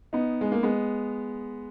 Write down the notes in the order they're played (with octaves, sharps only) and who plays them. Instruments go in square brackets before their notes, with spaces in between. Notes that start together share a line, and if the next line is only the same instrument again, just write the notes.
[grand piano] B3 D#4
G#3
A#3
G#3 B3